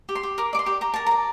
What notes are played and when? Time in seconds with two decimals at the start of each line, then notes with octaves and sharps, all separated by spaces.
0.09 G4
0.15 C6
0.23 G4
0.38 A#4 D6
0.53 D5 D6
0.59 C6
0.66 G4
0.81 G4 A#5
0.94 A#4 A5
1.06 D5 A#5